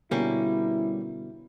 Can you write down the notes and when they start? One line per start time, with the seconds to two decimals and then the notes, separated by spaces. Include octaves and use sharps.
0.11 B2 D3 G3 A#3 C#4 E4